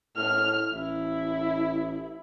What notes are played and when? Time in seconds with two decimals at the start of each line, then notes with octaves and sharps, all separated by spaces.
0.17 A2 F6
0.73 A1 E4